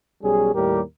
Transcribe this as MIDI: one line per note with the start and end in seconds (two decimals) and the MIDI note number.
0.23 0.54 35
0.23 0.54 55
0.23 0.54 61
0.23 0.54 68
0.55 0.81 39
0.55 0.81 45
0.55 0.81 55
0.55 0.81 67
0.55 0.81 70